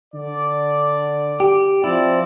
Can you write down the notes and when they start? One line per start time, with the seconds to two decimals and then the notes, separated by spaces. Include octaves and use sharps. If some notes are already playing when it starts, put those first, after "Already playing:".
0.14 D3 D5
1.40 G4
1.84 F3 C4 E4 D5